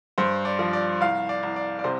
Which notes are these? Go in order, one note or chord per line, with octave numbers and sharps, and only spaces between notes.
G2 C5
D5
F3
D5
C2 F5
D5
C2
D5
D5
C3 C5